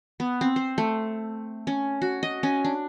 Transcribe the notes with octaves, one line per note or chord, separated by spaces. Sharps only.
B3
C4
C5
A3
C#4
F#4
D#5
C#4
D4